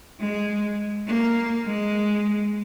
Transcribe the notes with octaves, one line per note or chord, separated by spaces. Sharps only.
G#3
A#3
G#3